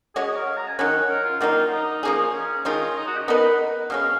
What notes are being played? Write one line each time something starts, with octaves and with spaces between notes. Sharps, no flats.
G#3 C#4 F#4 G#4 C#5
D#5
A#4
F5
A#5
G#5
D#3 F#3 C#4 F#5
A#4
F4
D#3 F#3 A#3 D#4 F4
D#4
F3 A#3 C#4 G#4
C#4
D#3 G#3 C#4 D#4 F4
D#4
F#4
D#5
B3 D#4 A#4 B4 D#5
B2 G#3 C#4 F5